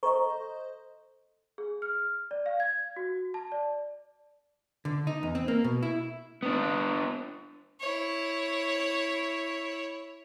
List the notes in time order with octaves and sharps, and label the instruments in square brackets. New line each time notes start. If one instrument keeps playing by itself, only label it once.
[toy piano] A4 A#5 C#6 [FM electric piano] C5 D#5
[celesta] G#4
F6
D5
F5
G#6
F#4
A5
D5
[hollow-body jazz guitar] D3
D#4
E2
C4
A#3
B2
E4
[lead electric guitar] B3 D4
[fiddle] E4 C#5